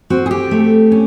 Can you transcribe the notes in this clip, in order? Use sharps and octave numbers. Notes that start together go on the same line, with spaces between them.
C4 F#4
G#4
G4
A3
C#4